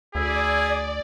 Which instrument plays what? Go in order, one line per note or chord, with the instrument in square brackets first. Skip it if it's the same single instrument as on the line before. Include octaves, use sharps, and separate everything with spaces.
[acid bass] D2 [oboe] E4 [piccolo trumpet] G#4 [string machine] D5